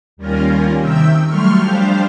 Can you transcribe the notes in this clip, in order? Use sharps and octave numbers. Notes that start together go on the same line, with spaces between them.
D#2 G3 A#3 C#4 F4 A#4
C3 D#3 E5 G5 E6
F#3 G3 A3 C6 C#6 F6
F3 G3 D4 G4 C5 F5